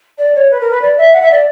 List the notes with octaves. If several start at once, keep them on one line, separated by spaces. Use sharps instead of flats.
D5
C#5
B4
A#4
B4
D5
E5
F#5
E5
D5